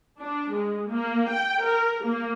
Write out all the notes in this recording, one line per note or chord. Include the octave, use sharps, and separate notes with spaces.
D4
G#3
A#3
G5
A#4
A#3